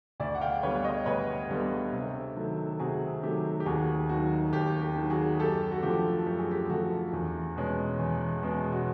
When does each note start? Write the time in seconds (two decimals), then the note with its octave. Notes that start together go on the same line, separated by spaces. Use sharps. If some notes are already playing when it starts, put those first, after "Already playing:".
0.20 D2 D5 E5
0.35 F#5
0.41 F5 G5
0.63 D3 G3 B3 B4 C#5
0.84 C#5 D#5
1.06 D2 B4 C#5
1.50 D3 G3 B3
1.93 C3
2.36 D#3 F#3 A3
2.80 C3 F#4 G#4
3.23 D#3 F#3 A3 G4
3.60 G4
3.66 D#2 F#4 G#4
4.09 D#3 F#3 F#4
4.53 D#2 G4
4.82 G4
4.96 D#3 F#3
5.10 F#4 G#4
5.39 F#2 G4 A4
5.72 F#4
5.83 D3 F3 A3 G4
6.26 F#2 G4
6.39 G#4
6.51 G4
6.69 D3 F3 A3 F#4
7.13 E2
7.56 B2 G#3 C#4
7.99 E2
8.42 B2 G#3 C#4
8.72 F#4